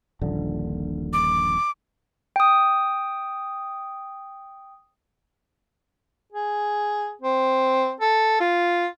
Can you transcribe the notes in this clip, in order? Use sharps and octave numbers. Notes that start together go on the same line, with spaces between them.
D#1 A#1 D3
D6
G5 D#6
G#4
C4
A4
F4